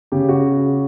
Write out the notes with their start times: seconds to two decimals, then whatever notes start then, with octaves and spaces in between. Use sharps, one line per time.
0.12 C#3 G4
0.29 F#4